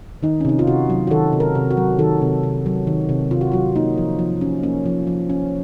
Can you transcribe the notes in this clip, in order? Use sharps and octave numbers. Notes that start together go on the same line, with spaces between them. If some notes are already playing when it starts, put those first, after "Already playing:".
D#3 D#4
C#4
C3 D#4
F4
C3 F#4
F#3
F#4
D#3 A4
C3
A#4
C3
F#4
F#3
D#3 A4
C3
C3
F#3
D#3
C3
C3 F4
F#4
F#3 F4
A#3 D#4
F3
F3
C#4
A#3 C#4
F3
F3
C#4